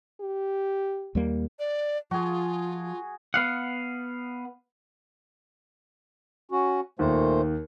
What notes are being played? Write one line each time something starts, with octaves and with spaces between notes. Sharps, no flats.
G4
D#2 G3 A#3
D5
F3 F4 F#4 G#4
B3 F5 F#5
C#4 F#4
D#2 A#2 A3 C5